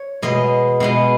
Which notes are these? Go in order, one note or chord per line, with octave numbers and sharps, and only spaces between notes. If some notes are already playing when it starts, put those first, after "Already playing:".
Already playing: C#5
B2 G#3 B3 D#5
B2 G#3 B3